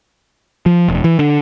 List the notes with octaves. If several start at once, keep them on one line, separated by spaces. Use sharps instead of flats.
F3
E1
E3
D3